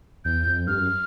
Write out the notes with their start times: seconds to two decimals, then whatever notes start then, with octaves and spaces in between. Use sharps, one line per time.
0.25 E2 G6
0.46 F2
0.67 G2 F6
0.79 F#2